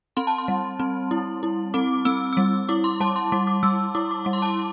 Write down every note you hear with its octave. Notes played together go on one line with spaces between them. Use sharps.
C4 C6
A5
C6
G3
C4
E4
E4
C4 D6
C4 E6
G3 E6
E4 D6
C6
G3 A5
C6
G3 D6
D6
G3 E6
E4 D6
D6
G3 D6
C6
A5